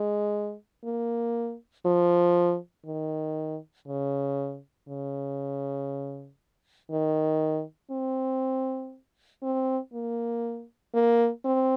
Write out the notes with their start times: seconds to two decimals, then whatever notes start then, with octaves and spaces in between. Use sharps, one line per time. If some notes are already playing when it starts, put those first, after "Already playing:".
Already playing: G#3
0.84 A#3
1.86 F3
2.86 D#3
3.88 C#3
4.88 C#3
6.91 D#3
7.91 C4
9.43 C4
9.94 A#3
10.94 A#3
11.45 C4